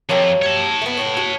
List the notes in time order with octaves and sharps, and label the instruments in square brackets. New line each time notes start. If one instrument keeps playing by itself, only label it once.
[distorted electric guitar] F2 [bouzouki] F#3 A#3 G4
[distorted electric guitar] C#5 A5
[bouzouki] A3 B3
A2 A4 F#5
F#4